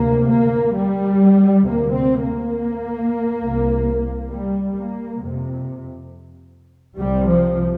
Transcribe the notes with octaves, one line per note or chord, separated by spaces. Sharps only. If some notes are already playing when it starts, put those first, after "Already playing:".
Already playing: D2 C3 A#3
A#3
G3
D2 C3 A#3
C4
A#3
C2 C3
G3
A#3
F2 C3
C2 C3 G3
F3